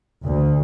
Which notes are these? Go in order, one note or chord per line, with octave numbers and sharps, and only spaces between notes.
D2